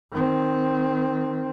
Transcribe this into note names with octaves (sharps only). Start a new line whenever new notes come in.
D#3 C4